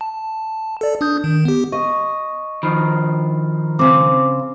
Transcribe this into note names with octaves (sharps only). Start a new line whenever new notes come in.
A5
A4 D5
D4 D#6 G6
D#3
B3 G4
D#5 C#6
D#3 F3 B5
C#3 C4 D6